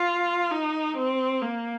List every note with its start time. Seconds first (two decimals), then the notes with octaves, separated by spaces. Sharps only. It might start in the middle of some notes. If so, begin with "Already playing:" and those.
Already playing: F4
0.51 D#4
0.96 C4
1.42 A#3